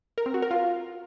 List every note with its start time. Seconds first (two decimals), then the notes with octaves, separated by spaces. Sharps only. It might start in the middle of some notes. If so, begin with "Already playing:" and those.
0.18 A#4
0.26 C4
0.34 F#4
0.42 A#4
0.51 F4